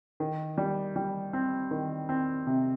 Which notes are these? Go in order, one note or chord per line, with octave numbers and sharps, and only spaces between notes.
D#3
G3
G3
C4
D#3
C4
C3